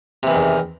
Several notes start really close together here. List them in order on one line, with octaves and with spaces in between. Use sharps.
C3 E3 D#3 E2